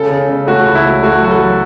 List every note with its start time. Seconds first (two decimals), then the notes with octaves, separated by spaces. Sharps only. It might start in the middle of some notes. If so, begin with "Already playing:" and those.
Already playing: C#3 A4
0.10 C#3
0.29 C#3
0.47 A3 F#4
0.66 C#2
0.75 E4
0.84 A3
1.03 A3 F#4
1.22 F#3 F#4
1.31 A4
1.40 F#3